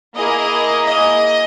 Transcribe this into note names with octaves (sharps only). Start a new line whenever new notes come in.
A#3 E4 G#4 D#5
D#5